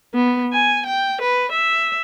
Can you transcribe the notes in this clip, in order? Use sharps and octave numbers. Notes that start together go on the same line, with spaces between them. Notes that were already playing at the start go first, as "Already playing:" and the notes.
B3
G#5
G5
B4
E5